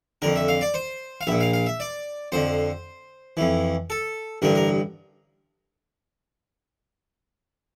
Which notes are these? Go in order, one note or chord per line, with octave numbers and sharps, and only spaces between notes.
F2 D3 A#4
E5
F5
D5
C5
F5
A#1 A#2 E5
F5
F5
E5
D5
F2 D3 C5
F2 E3
A4
A1 G2 D3 A#4
A#4